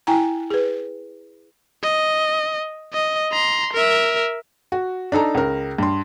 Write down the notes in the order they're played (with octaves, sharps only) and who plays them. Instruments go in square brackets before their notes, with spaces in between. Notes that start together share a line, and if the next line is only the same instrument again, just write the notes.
[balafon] E4 G5 G#5 A#5
G#4 B4
[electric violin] D#5
D#5
A#5 C6
A#4 E5
[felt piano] F#4
D4 D#4 A4 A#5
C#2 A#4
G2 C6